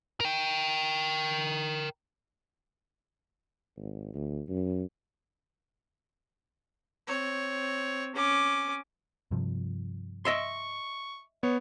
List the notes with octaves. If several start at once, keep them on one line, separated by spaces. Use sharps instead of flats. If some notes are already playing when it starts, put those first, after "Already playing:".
A#4 G5
G#1
D2
F#2
C4 C#5
C#4 D6
G2 C3 F3
D#5 E5 C6 C#6
B3 C#5